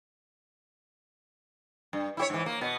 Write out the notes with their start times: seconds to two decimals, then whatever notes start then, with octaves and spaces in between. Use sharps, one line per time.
1.93 G2
2.17 E4 G4 C#5
2.30 G#2 E3
2.46 A#3
2.61 B2 B3